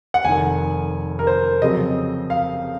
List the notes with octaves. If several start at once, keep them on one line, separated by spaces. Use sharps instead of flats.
F#5
F1 F2 D#3 G#5
A#4
C5
F2 C#3 F#3 C4 D#5
F5